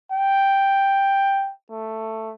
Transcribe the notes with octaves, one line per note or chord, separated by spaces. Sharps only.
G5
A3